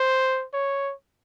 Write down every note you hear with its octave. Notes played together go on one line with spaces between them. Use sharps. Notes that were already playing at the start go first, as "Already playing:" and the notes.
Already playing: C5
C#5